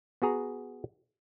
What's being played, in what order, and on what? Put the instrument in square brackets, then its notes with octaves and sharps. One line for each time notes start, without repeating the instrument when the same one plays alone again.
[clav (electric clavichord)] B3 F#4 G#4 A#5